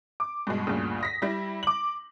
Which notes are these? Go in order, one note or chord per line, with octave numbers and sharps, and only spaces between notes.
D6
G2 B2 G#3
D2 G2 A#2 C#3
D#6 A#6 B6
G3 E4
D6 F#7